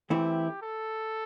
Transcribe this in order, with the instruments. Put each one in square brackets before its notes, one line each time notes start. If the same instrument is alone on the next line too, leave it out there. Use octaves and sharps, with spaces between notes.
[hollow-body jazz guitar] E3 A3 C4 E4 [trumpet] G4
[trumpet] A4